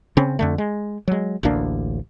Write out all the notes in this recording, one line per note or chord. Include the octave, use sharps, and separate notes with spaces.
C#3 C4 C#4
F2 D3 A3
G#3
F#3 G#3
A1 D2 A#3 D4